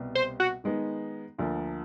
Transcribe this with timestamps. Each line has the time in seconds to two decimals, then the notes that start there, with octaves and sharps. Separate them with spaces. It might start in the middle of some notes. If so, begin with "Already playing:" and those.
Already playing: C2 B2 G3
0.15 C5
0.40 F#4
0.64 D#3 G#3 B3 D#4
1.38 D2 D3 F3 A#3